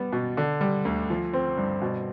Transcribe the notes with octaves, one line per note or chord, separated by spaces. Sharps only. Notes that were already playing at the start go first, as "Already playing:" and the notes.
Already playing: G3 B3
B2
D3
G3
D2
F3
C4
G2
B2